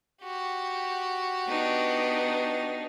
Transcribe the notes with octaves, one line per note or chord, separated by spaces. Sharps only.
F#4 G4
B3 D4 D#4